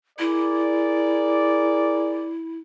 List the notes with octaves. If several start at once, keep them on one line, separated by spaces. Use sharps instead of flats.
E4 G#4 A#4 D5